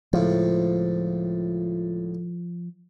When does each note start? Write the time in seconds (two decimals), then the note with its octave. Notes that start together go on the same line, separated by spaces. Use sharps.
0.13 C#2 A2 F3